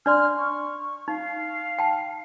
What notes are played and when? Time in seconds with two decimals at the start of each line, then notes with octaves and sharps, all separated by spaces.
0.06 D4 D5 C6 F6
0.37 C#6
1.08 D#4 F5
1.79 G5 A5